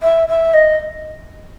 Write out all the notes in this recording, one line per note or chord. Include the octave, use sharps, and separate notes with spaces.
E5
E5
D#5